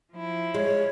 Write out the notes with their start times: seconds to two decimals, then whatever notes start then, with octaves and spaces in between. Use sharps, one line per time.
0.12 F3 E4
0.55 G#3 C#5